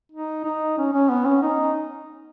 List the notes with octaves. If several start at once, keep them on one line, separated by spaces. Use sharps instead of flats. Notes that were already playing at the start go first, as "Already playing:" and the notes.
D#4
D#4
C#4
C#4
B3
C#4
D#4